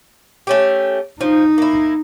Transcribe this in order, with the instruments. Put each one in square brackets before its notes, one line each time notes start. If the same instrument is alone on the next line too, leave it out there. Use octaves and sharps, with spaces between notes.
[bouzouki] A3 C#4 G4
[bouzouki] F3 [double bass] D#4
[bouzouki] A#3 E4